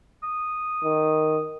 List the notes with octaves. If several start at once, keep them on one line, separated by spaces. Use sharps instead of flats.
D#6
D#3